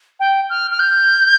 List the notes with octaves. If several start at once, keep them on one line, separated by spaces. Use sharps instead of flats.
G5
F6
F6
G6